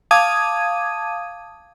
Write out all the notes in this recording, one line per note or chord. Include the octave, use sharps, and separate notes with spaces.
F5 A5 D6 D#6 G#6 D#7